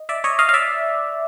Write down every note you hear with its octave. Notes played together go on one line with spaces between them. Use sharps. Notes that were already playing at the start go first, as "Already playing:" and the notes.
Already playing: D#5
D5 E5
C#5 D#5
D#5 F5
F5
D5 E5